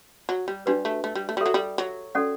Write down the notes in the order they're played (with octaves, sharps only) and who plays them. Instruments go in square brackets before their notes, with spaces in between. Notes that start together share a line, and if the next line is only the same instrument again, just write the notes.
[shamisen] F#3
G3
[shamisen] G3 [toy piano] D4 F#4 B4
[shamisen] A3
A3
G3
A3
G3
[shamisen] F#3 [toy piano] F#4 A4 E5
[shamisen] G3
F#3
[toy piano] C#4 F#4 A4 D5 F#5